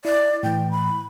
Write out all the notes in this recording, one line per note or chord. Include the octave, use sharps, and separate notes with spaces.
E4 D5
A2 E3 G5
B5